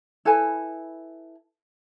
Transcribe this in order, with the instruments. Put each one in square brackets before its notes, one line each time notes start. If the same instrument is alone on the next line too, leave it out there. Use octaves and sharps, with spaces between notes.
[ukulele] E4 A4 B4 G#5